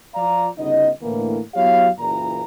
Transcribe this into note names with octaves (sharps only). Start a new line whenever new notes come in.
F3 F4 D5 F5 A#5
G1 C#3 B3 D#4 D#5
A2 D3 E3 A#3
F#3 B3 E4 G4 C#5 F5
F#1 A#2 E3 A#5